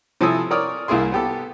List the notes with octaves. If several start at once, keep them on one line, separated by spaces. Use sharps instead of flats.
C3 F3 E4 A4 G#5 D#6
A#4 C#5 D5 D#6 F6
C2 A#3 E4 G#4 C6
B3 G4 A4